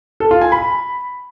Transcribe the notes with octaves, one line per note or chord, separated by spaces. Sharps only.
A4
F4
G#5
B5